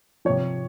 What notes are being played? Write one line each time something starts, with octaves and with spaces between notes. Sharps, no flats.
C3 F3 C#5